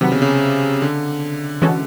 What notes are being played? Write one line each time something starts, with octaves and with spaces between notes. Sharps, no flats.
C3 D#3 F#3 B3
C#3
C#3
D3
E3 G#3 C#4 F#4 A4